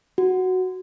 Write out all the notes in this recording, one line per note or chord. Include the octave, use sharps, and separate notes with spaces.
F#4